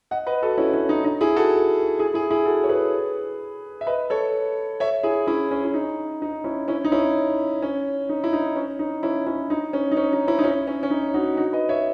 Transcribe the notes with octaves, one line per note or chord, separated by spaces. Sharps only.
D#5 F#5
B4 D#5
F#4 A4
C#4 E4
C#4 E4
D#4
D#4
E4 G#4
F#4 A4
E4 G#4
E4 G#4
E4 G#4
F#4 A4
C#5
G#4 B4
E5
B4 D#5
A4 C#5
C#5 E5
E4 G#4
C#4 E4
C#4
E4
D#4
D#4
C#4 E4
C#4 E4
D#4
C#4 E4
C#4
D#4
E4
D#4
C#4
D#4
C#4 E4
C#4 E4
D#4
C#4
D#4
C#4
D#4
C#4 E4
D#4
C#4 E4
C#4
C#4
D#4
D#4 F#4
D#4 F#4
B4 D#5
C#5 E5